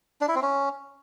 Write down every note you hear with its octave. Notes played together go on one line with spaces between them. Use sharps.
D4
E4
C4
C#4